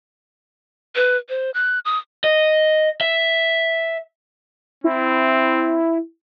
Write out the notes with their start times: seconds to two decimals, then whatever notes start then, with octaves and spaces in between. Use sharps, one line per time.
0.96 B4
1.29 C5
1.54 F#6
1.85 D#6
2.24 D#5
3.01 E5
4.84 C4 E4